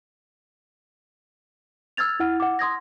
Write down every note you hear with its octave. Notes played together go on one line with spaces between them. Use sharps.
E6 F6 G#6 A6 F7
E4 F#5 F6
F#5 D6
C6 D#6 G#6 A#6